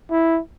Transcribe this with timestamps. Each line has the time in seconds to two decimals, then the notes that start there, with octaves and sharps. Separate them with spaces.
0.11 E4